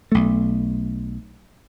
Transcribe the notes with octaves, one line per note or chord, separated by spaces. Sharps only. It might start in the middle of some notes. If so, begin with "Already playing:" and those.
B1 A3